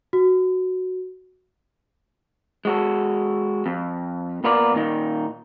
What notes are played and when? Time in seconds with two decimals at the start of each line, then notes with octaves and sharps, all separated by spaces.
0.13 F#4
2.65 G#3 F#4 A4
3.66 F2
4.44 A#2 B3 F4 A#4 D5
4.74 A#2 D#3 D#4